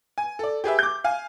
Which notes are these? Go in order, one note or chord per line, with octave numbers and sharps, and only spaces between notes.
G#5
A4 D5
G4 G#4 B4 E5
D6 G6
F5 G#5